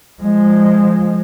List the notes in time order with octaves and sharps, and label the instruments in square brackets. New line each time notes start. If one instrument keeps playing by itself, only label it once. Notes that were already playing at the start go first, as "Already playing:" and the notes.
[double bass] F3 G#3